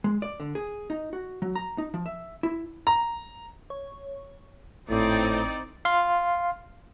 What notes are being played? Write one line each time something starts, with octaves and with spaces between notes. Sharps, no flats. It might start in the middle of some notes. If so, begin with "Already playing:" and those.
G#3
D5
D3
G#4
D#4
F#4
F#3
A#5
D#4
F3
E5
E4
A#5
C#5
G#1 A2 C4 D#4 D5
F5 C6